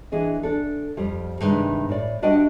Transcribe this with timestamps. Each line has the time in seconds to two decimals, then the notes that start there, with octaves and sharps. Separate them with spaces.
0.12 E3 D4 G#4 D#5
0.43 D4 A4
0.97 F2 G3 F4
1.40 G2 C3 D#3 G#3
1.89 A2 D5
2.22 G3 D4 F#4 D#5 E5 G5